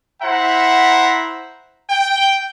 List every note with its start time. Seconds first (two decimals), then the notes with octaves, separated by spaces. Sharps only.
0.21 E4 C5 E5 F#5 A#5
1.90 G5